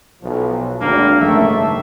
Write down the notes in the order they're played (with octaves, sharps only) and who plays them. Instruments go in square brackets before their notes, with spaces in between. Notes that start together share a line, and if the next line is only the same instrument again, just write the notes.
[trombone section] B1 F3
[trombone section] G#1 D2 [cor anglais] A#3 [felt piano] D4
[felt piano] F#1 [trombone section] G#2 D#3 A3 [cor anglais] E5